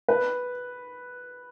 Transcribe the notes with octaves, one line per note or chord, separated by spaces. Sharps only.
B4